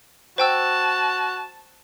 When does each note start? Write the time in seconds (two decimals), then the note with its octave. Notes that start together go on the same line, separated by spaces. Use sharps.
0.38 F#4 C5 G5 A5 E6